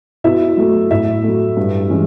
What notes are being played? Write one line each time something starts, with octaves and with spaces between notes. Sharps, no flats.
B2 E4 E5
F#3 A3
A2 E4 E5
F#3 A3
G2
E3 G#3 C#4